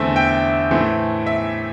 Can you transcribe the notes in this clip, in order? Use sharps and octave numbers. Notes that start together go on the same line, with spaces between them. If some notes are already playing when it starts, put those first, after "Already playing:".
Already playing: E2 D3 A3 C4 E5
G5
A2 E3 A3 C4
E5